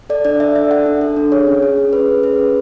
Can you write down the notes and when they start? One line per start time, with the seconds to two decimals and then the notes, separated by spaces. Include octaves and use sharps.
0.10 A4 D5
0.25 D4 D5
0.40 A4 E5
0.55 D4 E5
0.71 A4 F#5
0.86 D4
1.01 A4
1.16 D4
1.32 G#4 C#5
1.47 C#4
1.63 G#4
1.78 C#4
1.92 G#4 B4
2.08 C#4
2.23 G#4 B4
2.39 C#4